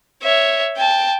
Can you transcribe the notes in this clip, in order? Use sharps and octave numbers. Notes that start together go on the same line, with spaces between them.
C#5 E5
G5 A5